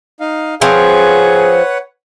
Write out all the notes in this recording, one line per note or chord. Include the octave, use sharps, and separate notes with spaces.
D#4 F5
F3 C4 G#4 B4 C#5 F#5